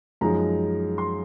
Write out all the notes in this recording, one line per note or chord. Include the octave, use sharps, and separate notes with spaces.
F#2 F3 G#3 D#4 A#5
C6